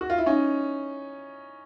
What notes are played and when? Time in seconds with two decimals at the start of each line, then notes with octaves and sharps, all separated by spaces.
0.01 F#4
0.10 F4
0.18 E4
0.26 C#4 D#4